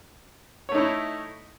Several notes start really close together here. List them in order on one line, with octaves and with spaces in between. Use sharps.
C#5 A3 D#4 E4